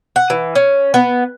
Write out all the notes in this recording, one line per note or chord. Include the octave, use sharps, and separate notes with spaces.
F#5
E3
C#4
B3